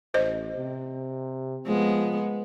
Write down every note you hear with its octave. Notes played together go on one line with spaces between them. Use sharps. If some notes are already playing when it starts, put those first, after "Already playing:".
A1 C5 D#5
C3
F3 G#3 B3